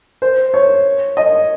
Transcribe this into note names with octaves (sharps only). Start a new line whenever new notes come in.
C5
C#5
D#5